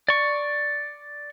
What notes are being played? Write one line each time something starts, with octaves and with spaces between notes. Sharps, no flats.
D5 C#6